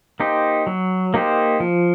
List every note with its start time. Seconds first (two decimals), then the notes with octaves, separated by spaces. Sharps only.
0.20 A#3 D#4 G4 C5
0.67 F#3
1.14 A#3 D#4 G4 C5
1.60 F3